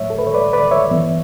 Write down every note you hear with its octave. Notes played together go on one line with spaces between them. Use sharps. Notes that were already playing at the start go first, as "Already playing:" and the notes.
Already playing: A2 F#3 A3 C#5 E5
A4
B4
C#5
B4 D5
B4 D5
C#5 E5
G2 E3 B3